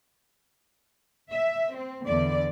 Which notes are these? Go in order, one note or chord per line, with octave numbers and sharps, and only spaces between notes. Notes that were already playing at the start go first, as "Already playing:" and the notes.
E5
C4
E2 D3 D5